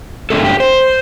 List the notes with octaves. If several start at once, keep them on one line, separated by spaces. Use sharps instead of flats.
G2 D3 F3 A3 C4 A4
G4
C5